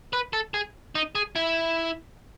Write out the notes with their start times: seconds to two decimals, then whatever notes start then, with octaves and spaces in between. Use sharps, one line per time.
0.13 B4
0.33 A4
0.54 G#4
0.95 D#4
1.15 G#4
1.36 E4